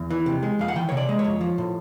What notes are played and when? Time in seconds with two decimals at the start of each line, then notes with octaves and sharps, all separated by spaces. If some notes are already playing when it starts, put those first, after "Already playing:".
Already playing: E2
0.10 E3
0.26 C3
0.43 G#3
0.59 F2 F5
0.68 F#5
0.76 E3 G5
0.89 C#5
0.92 C3
0.97 D5
1.09 G#3
1.19 C#5
1.24 F2
1.41 F3
1.58 A2